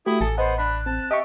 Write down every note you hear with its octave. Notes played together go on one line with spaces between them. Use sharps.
A3 E4 F#4 G4 D#6
A1 A4 G#5
B3 C5 D#5 F#5
D4 B5 F#6
C4 A5
G4 D#5 E5 C#6